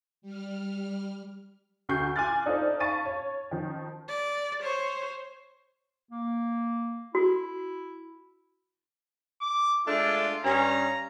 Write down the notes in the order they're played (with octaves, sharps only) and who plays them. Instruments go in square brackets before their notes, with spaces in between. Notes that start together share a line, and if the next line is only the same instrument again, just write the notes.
[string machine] G3 F6
[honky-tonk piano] D2 F#4 C#6 G6 C7
G#5 C6 D6 F6 F#6 A6
D4 D#4 F4 A4 C5
F5 A5 B5 C#6 A6 D#7
C#5
D#3 F3
[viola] D5
C5 C#5
[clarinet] A#3
[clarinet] E4 [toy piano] F#4
[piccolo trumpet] D6
[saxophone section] G#3 A3 D4 [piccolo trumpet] F4
[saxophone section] G2 C#4 [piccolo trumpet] A#5